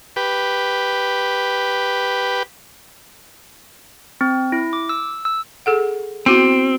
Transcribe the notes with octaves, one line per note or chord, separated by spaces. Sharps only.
G4 B4
C4
E4
D6
E6
E6
G#4 A4 F#5
B3 C4 E4 F#4